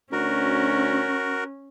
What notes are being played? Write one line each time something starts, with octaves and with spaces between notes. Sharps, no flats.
D2 C#4 F#4 A#4